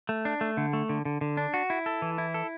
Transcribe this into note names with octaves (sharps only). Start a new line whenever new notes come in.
A3
D4
A3
D3
A3
D3
D3
D3
D4
F#4
E4
A4
E3
E4
A4